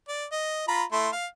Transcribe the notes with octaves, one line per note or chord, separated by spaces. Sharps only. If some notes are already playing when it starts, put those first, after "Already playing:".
D5
D#5
F4 A#5 B5
A3 E4 C6
F5